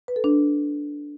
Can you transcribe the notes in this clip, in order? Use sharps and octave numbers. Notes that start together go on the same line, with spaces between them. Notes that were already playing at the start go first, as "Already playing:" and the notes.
B4
A4
D4